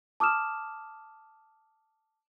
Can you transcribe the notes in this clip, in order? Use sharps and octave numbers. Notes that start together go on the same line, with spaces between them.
A5 D6 D#6 F6 E7